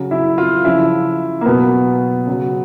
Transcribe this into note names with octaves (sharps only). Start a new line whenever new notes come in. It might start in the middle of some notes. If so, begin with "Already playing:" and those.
Already playing: C#3 F#3
E4
F4
C#3 F3 E4
A#3
B2 F#3 B3
C#3 F#3